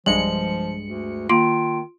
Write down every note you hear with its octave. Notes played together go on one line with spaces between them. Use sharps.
B1 G2 F3 G#3 C#7 F#7
D2
D#3 A#3 F4 C6 D7